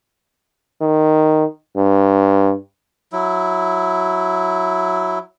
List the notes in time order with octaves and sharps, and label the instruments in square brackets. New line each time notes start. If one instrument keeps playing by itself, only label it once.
[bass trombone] D#3
G2
[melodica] F#3 E4